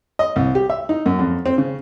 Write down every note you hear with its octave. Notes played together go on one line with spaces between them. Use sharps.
D#5
C2
G4
E5
D#4
F#2
F2
C4
C#3